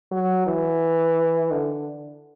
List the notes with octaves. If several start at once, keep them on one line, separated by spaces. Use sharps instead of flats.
F#3
E3
D3